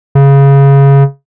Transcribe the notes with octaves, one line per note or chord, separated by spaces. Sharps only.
C#3